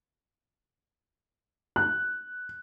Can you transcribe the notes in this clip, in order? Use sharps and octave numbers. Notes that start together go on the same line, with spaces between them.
F#6